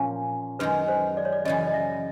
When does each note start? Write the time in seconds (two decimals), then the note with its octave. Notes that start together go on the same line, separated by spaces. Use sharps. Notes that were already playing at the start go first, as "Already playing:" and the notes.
Already playing: A#2 F3 A#3 C#4
0.59 F#2 D#3 G#3 B4
0.88 C5
1.17 D5
1.25 C#5
1.32 D5
1.45 F#2 C#3 E3 D#5
1.67 D#5
1.74 E5